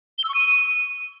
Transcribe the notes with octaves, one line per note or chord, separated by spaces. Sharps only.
G7
E6
C#6
D#7